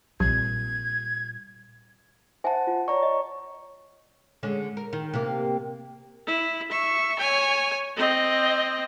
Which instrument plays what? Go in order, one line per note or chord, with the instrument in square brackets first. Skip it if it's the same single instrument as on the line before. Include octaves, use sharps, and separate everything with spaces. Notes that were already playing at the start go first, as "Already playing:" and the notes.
[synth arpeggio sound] A#1 [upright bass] A#2 C4 [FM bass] G3 [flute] G#6
[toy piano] D#4 E5 G#5 [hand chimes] C5 F#5 A5
[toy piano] F4
[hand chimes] C#5 A#5 C#6 [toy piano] D5
[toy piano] D#5
[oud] D3 G#3 C#4
A#4
D#3
C3 A#3
[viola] E4
E5 C#6
C#5 G#5
C4 D#5